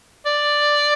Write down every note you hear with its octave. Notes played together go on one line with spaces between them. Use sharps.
D5